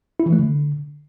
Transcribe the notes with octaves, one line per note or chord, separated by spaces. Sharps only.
E4
E3
A3
D3